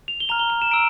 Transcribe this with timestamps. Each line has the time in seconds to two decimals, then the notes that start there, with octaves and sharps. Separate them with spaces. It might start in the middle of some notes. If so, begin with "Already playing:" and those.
0.08 F7
0.20 G7
0.29 A#5 F6 F7
0.39 G7
0.50 F7
0.62 E7
0.71 A#5 E6 D7